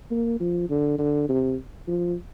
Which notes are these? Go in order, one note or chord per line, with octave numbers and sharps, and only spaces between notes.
A#3
F3
D3
D3
C3
F3